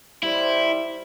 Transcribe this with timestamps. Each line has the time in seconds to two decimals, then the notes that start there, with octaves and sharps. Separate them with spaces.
0.23 G3 E4 C5